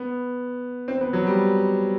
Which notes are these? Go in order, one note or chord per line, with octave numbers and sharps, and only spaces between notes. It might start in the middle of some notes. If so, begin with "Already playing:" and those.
Already playing: B3
C4
B3
F#3
G3